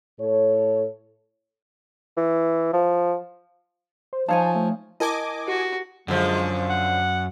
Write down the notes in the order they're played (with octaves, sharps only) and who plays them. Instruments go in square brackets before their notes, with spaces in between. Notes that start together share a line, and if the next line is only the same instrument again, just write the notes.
[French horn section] A2 A4 C#5
[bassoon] E3
F3
[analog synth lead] C5
[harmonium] F3 [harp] D#4 F5 [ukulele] C5 C#5 G#5 [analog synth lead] A5
[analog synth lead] A3
[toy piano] E4 A#4 A5 [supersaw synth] D#5 G#5 D6
[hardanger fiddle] F#4 [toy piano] G4
[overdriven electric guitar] F#2 [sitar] D3 F3 [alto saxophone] G#3
[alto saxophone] F#5